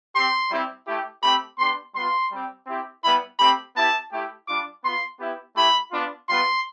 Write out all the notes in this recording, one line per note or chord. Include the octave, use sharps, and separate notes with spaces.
C4 G4 C6
G3 C4 E4 G4
A3 E4 G4
A3 C4 G4 B5
B3 D4 G4 C6
G3 B3 F4 C6
G3 C4 G4
C4 E4 G4
G3 B3 E4 B5
A3 C4 G4 B5
B3 E4 G4 A5
A3 E4 G4
G3 D4 F4 D6
B3 F4 C6
B3 E4 G4
A3 E4 G4 B5
B3 D4 F4
G3 B3 F4 C6